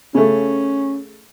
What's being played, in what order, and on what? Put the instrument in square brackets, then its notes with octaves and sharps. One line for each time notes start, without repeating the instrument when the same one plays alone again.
[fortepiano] C#3 A3 [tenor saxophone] C#4